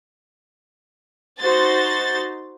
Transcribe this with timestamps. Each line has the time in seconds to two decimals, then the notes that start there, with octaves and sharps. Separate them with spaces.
1.40 D#4 F#4 C5 A6